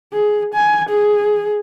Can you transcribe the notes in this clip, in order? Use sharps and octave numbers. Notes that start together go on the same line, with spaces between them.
G#4
G#5
G#4